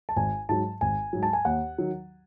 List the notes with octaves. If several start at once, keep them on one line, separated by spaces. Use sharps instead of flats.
A5
G#1 G#5
G#2 F#3 A5
G#1 G#5
G#2 F#3
A5
G#5
D#2 F#5
D#3 F#3